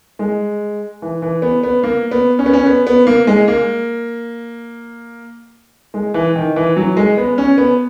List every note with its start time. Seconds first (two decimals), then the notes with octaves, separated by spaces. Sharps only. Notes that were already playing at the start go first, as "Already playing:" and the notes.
0.19 G#3
1.02 E3
1.22 E3
1.42 B3
1.63 B3
1.83 A#3
2.11 B3
2.39 C#4
2.46 B3
2.53 C#4
2.66 B3
2.87 B3
3.07 A#3
3.27 G#3
3.48 A#3
5.94 G#3
6.14 E3
6.36 D#3
6.56 E3
6.77 F#3
6.97 G#3
7.17 B3
7.38 C#4
7.58 B3